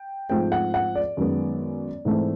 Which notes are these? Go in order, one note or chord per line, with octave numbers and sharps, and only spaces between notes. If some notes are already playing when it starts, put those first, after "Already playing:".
Already playing: G5
G#2 F3 A3 C4 G5
F#5
F#5
D5
F#2 D#3 G#3 B3
G#2 E3 A3 C4